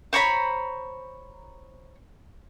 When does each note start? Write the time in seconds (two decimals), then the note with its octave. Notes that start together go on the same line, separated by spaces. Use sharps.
0.13 C5 C#5 A#5 B5